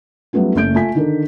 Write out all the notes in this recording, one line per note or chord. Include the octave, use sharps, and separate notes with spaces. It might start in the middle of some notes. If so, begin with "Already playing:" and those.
F#3 G3 A3 B3 C#4 F4
F#1 A3 C#4 G6 D7
A3 F4 G#5 B6
D3 D#3 D4 A4 A#4